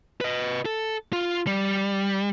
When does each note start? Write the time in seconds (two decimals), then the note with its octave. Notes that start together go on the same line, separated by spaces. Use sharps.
0.21 B4 D#5
0.65 A4
1.13 F4
1.47 G3